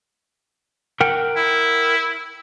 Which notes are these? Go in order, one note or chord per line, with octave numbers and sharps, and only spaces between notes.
A#4 F#5 G5
E4